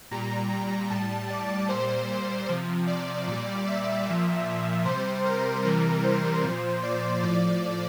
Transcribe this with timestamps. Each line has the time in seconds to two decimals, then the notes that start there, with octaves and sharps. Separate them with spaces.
0.11 A#2 G3 A#5
0.90 A2 G3 A5
1.30 D5
1.69 A#2 G3 C5
2.49 C3 F3
2.87 D5
3.27 A#2 G3
3.67 E5
4.06 A#2 F3 E5
4.46 E5
4.85 C3 G3 C5
5.25 A#4
5.64 C3 E3 G3 A#4
6.04 C5
6.44 A#2 F3
6.83 D5
7.23 A2 F3 D5